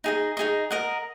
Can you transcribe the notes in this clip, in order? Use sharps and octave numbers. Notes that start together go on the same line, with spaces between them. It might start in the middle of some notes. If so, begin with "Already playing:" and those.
D#4 G#4 D#5
D#4 G#4 D#5
A#4 D#5 F#5